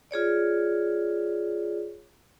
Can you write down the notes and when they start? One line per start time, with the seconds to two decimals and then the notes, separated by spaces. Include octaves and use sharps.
0.11 F4 G#4 C#5 D5